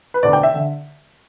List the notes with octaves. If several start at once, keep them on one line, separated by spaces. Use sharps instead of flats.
B4
E1 D2 D3 A3 D5
G5
E5
D3